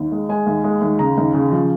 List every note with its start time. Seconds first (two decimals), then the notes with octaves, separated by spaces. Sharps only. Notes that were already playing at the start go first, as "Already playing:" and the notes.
Already playing: D#2
0.12 G#3
0.29 G#3 G#5
0.46 D#2
0.64 G#3
0.81 D#2
0.99 C#3 A#5
1.17 D#2
1.34 C#3
1.52 F3